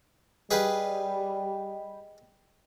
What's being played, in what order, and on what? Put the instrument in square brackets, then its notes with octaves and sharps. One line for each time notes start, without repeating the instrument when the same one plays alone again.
[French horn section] G3 [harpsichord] G#4 B4 F5 [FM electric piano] D#5 G5 B5